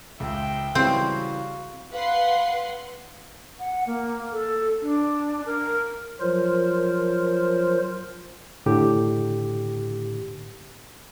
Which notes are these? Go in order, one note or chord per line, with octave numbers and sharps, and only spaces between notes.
C#2 E5 G5
C#3 E3 G3 C4 F#4 F5
B4 F5 F#5 C6
F#5
A#3
A4
D4
A#4
F3 F#3 F4 A#4 C5
A2 D3 G4